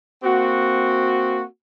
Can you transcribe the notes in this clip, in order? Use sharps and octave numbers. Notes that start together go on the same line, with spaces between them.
A#3 C4 F#4